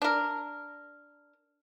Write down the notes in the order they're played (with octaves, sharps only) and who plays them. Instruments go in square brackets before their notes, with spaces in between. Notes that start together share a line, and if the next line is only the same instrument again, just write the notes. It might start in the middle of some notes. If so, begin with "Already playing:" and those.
[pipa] D4 A#4